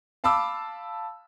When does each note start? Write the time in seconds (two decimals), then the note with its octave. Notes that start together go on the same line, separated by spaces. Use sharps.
0.24 F5 A5 B5 D6 E6